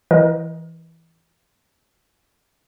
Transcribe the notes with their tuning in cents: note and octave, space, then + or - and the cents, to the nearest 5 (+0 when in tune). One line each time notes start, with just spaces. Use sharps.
E3 +0 A#4 +35 D#5 +0